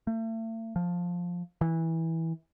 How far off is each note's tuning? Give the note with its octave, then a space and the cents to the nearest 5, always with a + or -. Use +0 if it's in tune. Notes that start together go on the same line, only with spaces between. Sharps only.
A3 +40
F3 +10
E3 -15